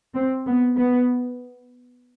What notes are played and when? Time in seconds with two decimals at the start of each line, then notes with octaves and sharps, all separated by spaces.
0.14 C4
0.47 B3
0.77 B3